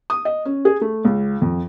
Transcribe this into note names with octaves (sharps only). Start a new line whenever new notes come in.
D#6
D#5
C#4
G#4
A3
C#2
F2